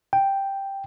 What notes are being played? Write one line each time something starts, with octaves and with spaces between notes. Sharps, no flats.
G5